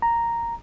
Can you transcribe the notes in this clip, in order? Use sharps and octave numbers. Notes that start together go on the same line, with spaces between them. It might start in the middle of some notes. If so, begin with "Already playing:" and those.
A#5